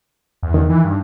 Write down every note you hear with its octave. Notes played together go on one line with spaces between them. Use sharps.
E2
D#3
E3
G2